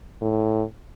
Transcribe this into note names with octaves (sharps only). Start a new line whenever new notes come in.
A2